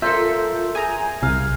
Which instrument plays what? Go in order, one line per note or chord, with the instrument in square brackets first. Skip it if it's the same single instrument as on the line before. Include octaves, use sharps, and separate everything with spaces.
[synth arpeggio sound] F4 A4 [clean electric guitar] A#4 E5 [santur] C5
[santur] G#4 [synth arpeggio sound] G#5 A#5
[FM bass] C2 [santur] F5